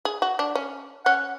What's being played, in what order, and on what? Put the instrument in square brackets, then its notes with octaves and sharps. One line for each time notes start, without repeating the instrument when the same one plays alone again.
[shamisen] G#4
F#4
D4
C#4
[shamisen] C#4 [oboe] F#5